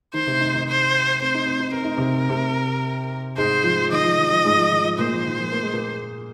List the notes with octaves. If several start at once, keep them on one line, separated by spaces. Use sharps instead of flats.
D#3 D#4 C5
C3 C4
D#3 D#4
D#3 D#4
C5
C4 C5
D#4
C4
D#4
C4 A#4
D#4
C3 C4
C3 C4
G#2 G#3 C5
F3
D#3 D#5
F3
D#3
F3
G#2 G#3
F3
D#3
F3
A#2 A#3 C5
F3
D#3
F3
A#3
G#3
A#2 A#3